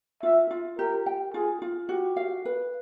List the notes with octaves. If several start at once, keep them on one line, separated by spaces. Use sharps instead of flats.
F4 E5
F4
G4 A#4
G5
F4 G#4
F4
F#4 G4
F5
B4